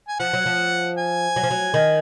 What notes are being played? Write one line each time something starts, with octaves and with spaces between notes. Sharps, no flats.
G#5
F3 F#5
F#3
F3
G#5
F#3
F3
F#3
D#3